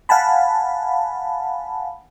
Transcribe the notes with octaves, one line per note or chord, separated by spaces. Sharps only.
F5 F#5 G#5 A5 B5